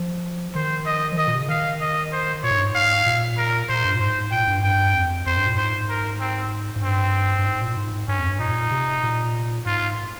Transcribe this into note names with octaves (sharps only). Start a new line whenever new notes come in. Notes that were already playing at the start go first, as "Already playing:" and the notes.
Already playing: F3
D#3 C5
D#5
F3
D#3 D#5
A#2
C3
C#3
D#3 F5
D#5
C5
A#2 C#5
G#2
G2
G#2
F5
A#2
A#4
A#2 C5
G2
A#2
G#2 C5
A#2 G5
G#2
G2
G2 G5
F2
F2 C5
G2
A#2
G#2 C5
A#4
C4
G#2
G2 C4
G2
G#2
A#2
G#2
G2 C#4
F2
G2
A#2 D#4
C3
A#2
G#2 F4